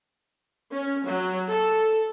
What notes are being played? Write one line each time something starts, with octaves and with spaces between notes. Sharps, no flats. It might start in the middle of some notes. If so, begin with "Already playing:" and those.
C#4
F#3
A4